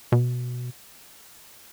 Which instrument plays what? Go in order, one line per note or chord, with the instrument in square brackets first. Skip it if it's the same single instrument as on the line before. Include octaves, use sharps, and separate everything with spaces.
[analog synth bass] B2